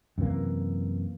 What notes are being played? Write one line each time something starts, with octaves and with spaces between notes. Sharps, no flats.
F#2 C3 E3 A#3